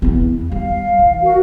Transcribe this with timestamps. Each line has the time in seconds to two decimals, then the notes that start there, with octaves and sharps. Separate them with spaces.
0.02 E2 B3
0.52 G3 F5
0.99 E3
1.21 F#4 A#4 F5